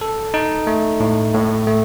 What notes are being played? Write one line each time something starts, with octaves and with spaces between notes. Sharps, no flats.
A4
D#4
A3
A2
A2
A3